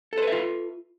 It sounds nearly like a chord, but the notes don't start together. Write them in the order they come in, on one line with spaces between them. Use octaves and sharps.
A4 C5 B4 E5 F4